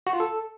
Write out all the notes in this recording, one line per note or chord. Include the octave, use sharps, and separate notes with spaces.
F#4
F4
A4